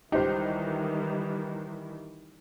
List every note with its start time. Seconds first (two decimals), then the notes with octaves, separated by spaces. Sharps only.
0.12 C#2 D#3 E3 G3 D#4 G4 C5